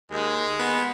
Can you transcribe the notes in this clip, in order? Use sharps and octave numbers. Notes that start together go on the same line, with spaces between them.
D#2 G#3
B3